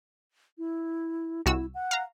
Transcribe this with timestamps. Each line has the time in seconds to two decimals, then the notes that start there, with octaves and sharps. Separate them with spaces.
0.58 E4
1.46 C2 E4 F#4 E6
1.74 F#5
1.91 F5 A#5